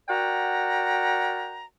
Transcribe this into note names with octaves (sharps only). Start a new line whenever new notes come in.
F#4 A#4 D5 F#5 G5 A#5